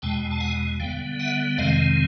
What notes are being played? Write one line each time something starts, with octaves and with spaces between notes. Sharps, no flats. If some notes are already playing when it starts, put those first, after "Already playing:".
E2 B2 G#3 G5 A5
A5
F#5 G#5
D3 G3 B3 F5 G5
E5 F#5
F2 C3 D#3 G#3 C4 D#5 F5